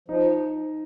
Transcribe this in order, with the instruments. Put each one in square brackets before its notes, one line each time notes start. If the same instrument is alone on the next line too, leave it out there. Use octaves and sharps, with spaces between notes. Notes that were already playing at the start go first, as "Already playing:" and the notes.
[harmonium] F3 [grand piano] D#4